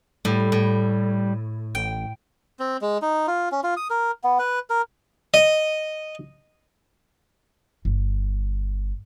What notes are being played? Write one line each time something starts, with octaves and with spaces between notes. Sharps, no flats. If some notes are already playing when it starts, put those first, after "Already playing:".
A2 G3
A2
A1 G5
C4
G#3
D#4
F4
C#4
F4
D#6
A#4
B3
B4
A#4
D#5
G1